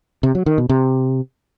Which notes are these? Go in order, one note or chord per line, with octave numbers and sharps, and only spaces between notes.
C3
F#3
D#3
B2
C3